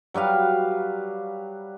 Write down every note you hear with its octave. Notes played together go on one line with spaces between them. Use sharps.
F#3 G3 B4 F5